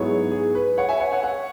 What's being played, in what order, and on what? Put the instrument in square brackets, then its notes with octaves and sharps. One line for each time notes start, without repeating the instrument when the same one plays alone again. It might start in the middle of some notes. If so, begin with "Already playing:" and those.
Already playing: [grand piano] G#2 F#3 B3 E4 G#4 C#5
G#4
B4
C#5 F#5
E5 G#5
C#5 F#5
C#5 F#5
C#5 F#5